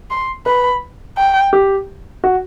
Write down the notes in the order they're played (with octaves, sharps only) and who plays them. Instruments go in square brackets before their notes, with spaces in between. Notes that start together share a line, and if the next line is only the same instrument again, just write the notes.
[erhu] C6
[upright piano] B4 [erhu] B5
[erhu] G5
[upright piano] G4
F#4